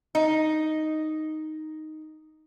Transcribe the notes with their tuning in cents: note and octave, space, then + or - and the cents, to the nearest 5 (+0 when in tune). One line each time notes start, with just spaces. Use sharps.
D#4 +0